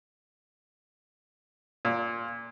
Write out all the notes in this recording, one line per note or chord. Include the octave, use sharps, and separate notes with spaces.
A#2